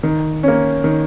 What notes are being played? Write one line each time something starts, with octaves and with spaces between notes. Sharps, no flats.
D#3
A#3 C#4
D#3